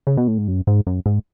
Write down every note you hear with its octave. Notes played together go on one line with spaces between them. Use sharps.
C#3
B2
A2
G#2
F#2
G#2
F#2
G#2